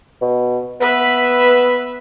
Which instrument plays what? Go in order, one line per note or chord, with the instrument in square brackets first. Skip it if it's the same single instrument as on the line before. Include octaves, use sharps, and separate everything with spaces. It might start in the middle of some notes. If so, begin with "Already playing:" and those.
[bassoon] B2
[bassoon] B3 [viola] B4 E5